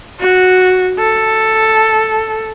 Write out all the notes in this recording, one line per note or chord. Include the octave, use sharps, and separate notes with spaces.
F#4
A4